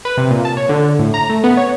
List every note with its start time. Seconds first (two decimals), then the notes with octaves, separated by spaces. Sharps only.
0.05 B4
0.17 C3
0.31 A#2
0.45 A5
0.57 C#5
0.69 D3
0.99 A2
1.14 A#5
1.29 A3
1.44 B3
1.57 C#5